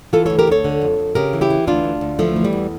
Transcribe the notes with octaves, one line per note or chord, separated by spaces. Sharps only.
E3 F4 A4
D2 A4 C#5
G4 A#4
D2 A4 C#5
D3
F2
F2
C#3 G4 A#4
E3
E4 G4
E3
D2 D4 F4
D2
D2
E3 F3 A3
E3
G3
E2